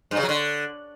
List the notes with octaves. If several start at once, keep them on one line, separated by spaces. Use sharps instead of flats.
G2
C#3
F#3
D3